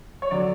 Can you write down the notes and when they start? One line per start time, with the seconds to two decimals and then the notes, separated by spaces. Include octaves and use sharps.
0.22 C#5
0.31 D3 F#3 D5